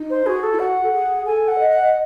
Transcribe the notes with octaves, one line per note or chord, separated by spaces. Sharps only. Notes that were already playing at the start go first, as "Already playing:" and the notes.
Already playing: D#4
C5
F#4 G#4
A4
E4
F#4 F#5
A4
G#4
A4 G#5
F#5
D#5
F#5